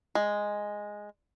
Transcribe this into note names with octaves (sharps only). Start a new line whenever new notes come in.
G#3